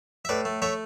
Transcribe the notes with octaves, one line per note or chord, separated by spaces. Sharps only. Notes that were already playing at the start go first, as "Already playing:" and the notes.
E5
A2 B4 D5
A3
A3 C#5 E5